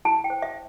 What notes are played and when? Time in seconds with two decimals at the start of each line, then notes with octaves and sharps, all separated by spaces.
0.05 E4 A5
0.24 G5
0.30 C5
0.42 E5